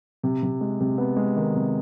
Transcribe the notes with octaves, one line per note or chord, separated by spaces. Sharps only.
C3
C3
G#3
C3
B3
G#3
D#3
C3